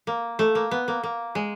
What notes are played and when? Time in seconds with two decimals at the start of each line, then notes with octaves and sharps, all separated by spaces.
0.07 A#3
0.39 A3
0.55 A#3
0.71 B3
0.88 A#3
1.03 A#3
1.35 G#3